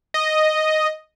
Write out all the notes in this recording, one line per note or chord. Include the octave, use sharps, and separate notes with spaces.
D#5